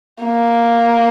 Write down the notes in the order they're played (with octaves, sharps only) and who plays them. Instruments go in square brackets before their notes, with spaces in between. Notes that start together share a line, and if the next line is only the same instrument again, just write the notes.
[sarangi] A#3